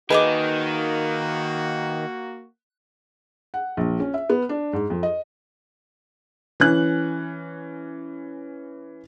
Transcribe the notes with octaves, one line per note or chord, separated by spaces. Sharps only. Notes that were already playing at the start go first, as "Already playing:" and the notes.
D#3 A#3 F#4 G#4 B4 D#5 D6
F#5
A#1
C#4
E5
B3
D4
G#2
F2
D#5
E3 C#4 F#6